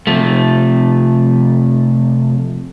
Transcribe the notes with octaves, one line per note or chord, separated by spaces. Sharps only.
C3 F3 A3